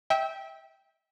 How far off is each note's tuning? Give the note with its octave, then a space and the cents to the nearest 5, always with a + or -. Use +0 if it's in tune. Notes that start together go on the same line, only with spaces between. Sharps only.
E5 -25 G5 +0